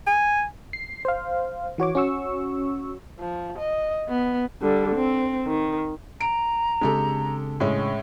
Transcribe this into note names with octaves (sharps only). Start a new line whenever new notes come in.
G#5
C7
C5 F5
E3 F#4 C#5 D6
C#4 F#4 C#6 E6
F3
D#5
B3
D3 G3
C4
D#3
A#5 D7
C#3 G#3 C4 D4 G4 A4
A2 G#3 C#4